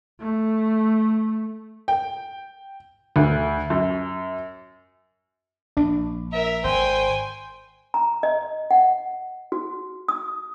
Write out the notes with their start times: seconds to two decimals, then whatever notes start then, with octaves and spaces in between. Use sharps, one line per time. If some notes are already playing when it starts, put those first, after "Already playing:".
0.20 A3
1.88 G5
3.16 D2
3.70 F#2
5.77 A#1 D4
6.33 A#4 E5
6.64 G#1 C5 G5 G#5
7.94 A#5
8.23 D#5
8.71 F#5
9.52 F#4
10.08 D#6